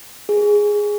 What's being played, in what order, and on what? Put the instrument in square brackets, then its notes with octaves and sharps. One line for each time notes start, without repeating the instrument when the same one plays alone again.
[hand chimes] G#4